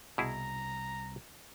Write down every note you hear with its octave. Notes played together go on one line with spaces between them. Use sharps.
C2 B2 E4 G#4 A#5